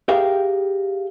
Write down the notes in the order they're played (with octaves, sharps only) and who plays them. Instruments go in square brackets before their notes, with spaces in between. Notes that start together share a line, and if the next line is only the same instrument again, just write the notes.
[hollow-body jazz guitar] G4 G#4 A#4 E5 F5 G5